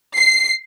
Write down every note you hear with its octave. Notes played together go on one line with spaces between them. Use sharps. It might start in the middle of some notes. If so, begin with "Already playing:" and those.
C7